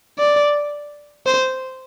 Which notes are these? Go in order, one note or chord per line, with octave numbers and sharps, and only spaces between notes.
D5
C5